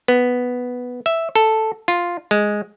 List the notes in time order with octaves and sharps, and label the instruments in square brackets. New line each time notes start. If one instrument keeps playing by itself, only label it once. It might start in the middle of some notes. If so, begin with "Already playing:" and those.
[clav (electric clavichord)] B3
E5
A4
F4
G#3